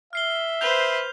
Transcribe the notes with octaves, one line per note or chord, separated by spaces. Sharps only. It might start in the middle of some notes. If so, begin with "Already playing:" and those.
E5 F6 C7 G7
B4 C5 G6 F7 G7